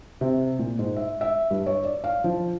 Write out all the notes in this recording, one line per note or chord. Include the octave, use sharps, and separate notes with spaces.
C3
A#2
G#2
E5
E5
G2
C#5
D5
F5
F3